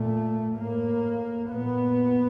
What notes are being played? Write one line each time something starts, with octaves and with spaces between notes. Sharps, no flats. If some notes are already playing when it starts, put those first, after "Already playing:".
Already playing: A#2 A3
A2 A#3
A#2 B3